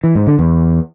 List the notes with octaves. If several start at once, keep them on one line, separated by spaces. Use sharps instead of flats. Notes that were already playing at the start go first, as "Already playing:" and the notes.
E3
G#2
D3
E2